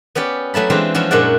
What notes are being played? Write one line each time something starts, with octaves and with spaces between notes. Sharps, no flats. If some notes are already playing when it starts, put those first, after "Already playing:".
B3 C#4 G4 D5
F#3 A3 A5 B5
E3 G#3 C4 D4 F4 G4
F3 C#4 E4 F#4
F#2 A#2 G#3 D4 D5 F#5